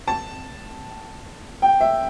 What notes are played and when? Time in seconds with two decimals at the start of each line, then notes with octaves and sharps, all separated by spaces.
0.08 A5
1.62 G5
1.81 E5